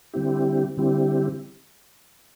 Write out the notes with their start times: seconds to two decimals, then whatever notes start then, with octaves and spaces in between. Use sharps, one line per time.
0.14 D3 G3 C4 E4 G4
0.77 D3 G3 C4 E4 G4